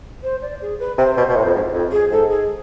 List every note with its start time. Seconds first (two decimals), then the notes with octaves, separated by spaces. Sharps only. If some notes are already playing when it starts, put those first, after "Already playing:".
0.23 C5
0.41 D5
0.61 G#4
0.79 B4
0.98 C3 C5
1.17 B2
1.29 B2
1.36 A2
1.45 F2
1.55 G#2
1.74 F2
1.92 G#4
2.11 G#2 A4
2.29 G#4